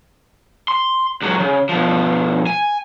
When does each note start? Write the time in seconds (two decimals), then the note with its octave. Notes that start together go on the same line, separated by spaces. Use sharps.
0.68 C6
1.22 C#2 F#3
1.40 C#3
1.69 B2 F3
2.47 G#5